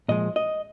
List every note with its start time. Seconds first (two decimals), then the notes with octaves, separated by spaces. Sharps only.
0.08 A#2 F3 G#3 D#5
0.36 D#5